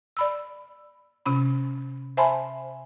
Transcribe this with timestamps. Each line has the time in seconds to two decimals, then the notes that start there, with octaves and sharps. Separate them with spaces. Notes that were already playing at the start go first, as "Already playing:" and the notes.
0.17 D5 B5 E6
1.26 C3 C#4 B5
2.17 C5 E5 G#5 A5 B5 C6